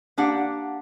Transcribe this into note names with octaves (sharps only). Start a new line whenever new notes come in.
A#3 D4 G4 F#5